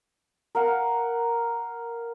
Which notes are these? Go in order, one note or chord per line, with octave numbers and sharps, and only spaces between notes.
A#4 F5 F#5